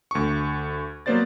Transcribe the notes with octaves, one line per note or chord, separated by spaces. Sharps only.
D2 C#6
F#3 A#3 B3 C5 D5 A6